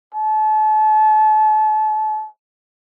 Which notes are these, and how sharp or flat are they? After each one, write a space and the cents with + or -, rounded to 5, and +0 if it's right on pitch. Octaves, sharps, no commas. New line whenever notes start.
A5 -35